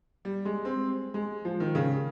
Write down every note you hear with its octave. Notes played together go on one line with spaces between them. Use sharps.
G3
G#3
C4
G#3
F3
D#3
C#3